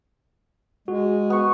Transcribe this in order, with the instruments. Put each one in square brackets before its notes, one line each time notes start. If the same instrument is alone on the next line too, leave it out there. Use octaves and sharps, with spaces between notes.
[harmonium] G#3 [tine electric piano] F#4
[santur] B3 C#6